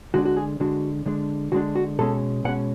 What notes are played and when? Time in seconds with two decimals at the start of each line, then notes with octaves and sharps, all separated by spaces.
0.14 D3 G#3 D4 F#4
0.25 F#4
0.37 G#4
0.60 D3 G#3 D4 F#4
1.06 D3 G#3 D4
1.52 D3 G#3 D4 F#4
1.75 F#4
1.99 B2 G#3 C#4 A4
2.44 B2 G#3 C#4 F#5